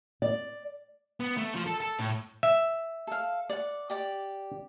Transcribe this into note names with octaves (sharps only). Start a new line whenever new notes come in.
D5
B3
A3
F3
A4
A4
A2
E5
A4 F5
D5 F#5
G4 D5 D6